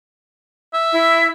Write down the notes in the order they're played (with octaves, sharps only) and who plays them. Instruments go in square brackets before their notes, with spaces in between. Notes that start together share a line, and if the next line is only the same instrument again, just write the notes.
[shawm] E5
[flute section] E4